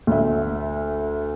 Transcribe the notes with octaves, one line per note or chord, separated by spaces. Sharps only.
D2 E5